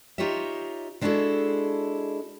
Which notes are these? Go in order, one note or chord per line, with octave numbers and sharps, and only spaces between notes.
D#4 F4 G4 C#5 D#5 E5
G#3 D4 E4 F#4 G#4 A4